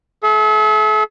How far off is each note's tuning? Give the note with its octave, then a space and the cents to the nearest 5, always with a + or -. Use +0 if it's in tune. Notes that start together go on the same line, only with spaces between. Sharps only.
A4 -45 E5 +15